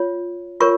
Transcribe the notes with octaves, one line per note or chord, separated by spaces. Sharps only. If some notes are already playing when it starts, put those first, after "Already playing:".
Already playing: F4 C#5
F4 A#4 C#5 C#6